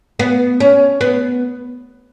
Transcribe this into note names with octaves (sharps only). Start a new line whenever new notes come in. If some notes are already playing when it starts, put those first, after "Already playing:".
B3
C#4
B3